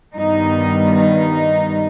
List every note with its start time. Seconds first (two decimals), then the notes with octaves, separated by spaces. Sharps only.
0.15 G2 D#3 G3 B3 D#4
0.96 D#4